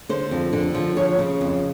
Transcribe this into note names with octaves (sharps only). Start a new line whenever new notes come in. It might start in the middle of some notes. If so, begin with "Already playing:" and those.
D3 C5
F2
D3
F3
F3 C#5
C#3
F2